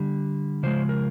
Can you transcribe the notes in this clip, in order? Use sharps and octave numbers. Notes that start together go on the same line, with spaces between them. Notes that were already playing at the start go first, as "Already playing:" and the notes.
Already playing: D3 G3
C#3 F3 G#3 C5
A#4